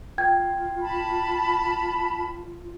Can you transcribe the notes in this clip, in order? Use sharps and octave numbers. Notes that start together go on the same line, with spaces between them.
F4 G5 G#6
A5 B5